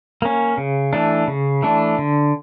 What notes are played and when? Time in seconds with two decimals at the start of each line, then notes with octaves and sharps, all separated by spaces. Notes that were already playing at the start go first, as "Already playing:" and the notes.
0.22 A#3 C#4
0.58 C#3
0.93 E3 A3 D4
1.28 C#3
1.63 E3 A3 D4
1.98 D3